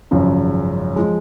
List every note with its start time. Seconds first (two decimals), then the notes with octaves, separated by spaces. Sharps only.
0.11 G#1 F#2 C#3 F3 G#3
0.96 F3 G#3